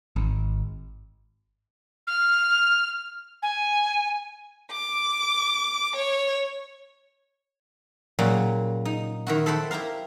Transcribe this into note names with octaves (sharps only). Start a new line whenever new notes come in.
G#1
F6
G#5
D6
C#5
A#2 C#3 F#3 G3 A#3
D#4
D#3 E4 F#4
A4 C5 E5 F#5 G5 B5
E4 G4 A#4 F5